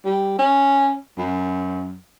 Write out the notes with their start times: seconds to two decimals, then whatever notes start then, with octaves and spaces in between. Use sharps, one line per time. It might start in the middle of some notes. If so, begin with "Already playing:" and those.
0.05 G3
0.39 C#4
1.18 F#2